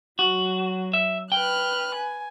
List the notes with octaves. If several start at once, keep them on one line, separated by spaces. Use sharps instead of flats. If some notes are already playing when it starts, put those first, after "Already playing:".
F#3 F#4
E5
B4 G5 F6 F#6
G#5